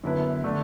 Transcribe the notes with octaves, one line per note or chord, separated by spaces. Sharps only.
F#2 D3 B3 E4 B4
D3 A3 D4